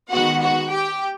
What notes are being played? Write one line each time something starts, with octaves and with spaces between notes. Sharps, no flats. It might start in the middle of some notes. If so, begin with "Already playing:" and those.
D#3 G#3 B3 F#4 F#5
F#4 F#5
G4 G5